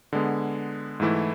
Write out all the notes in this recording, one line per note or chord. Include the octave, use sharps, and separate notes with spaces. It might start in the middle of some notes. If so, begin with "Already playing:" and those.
D3 G#3 B3
G#2 E3 A3 E4